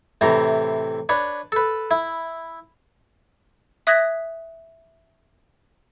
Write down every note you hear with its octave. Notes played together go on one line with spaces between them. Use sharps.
A2 C3 E3 A#5
D4 B4 C#5
A4 B4
E4
E5 D#6 F#6 G#6 A#6 B6